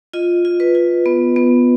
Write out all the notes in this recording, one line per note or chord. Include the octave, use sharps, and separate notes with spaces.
F4 D#5
F4
B4
F4
B3
B3